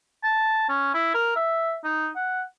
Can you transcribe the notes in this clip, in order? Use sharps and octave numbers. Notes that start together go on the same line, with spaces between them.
A5
C#4
E4
A#4
E5
D#4
F#5